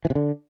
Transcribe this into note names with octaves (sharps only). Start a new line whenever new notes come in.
E3
C3
D3